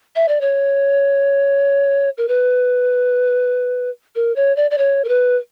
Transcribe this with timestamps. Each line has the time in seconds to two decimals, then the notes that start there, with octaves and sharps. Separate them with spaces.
0.16 E5
0.28 D5
0.41 C#5
2.18 A#4
2.28 B4
4.15 A#4
4.36 C#5
4.56 D5
4.71 D5
4.78 C#5
5.04 A#4
5.08 B4